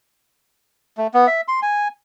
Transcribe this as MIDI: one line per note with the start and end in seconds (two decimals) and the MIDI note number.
0.98 1.07 57
1.14 1.27 59
1.27 1.41 76
1.48 1.60 84
1.62 1.88 80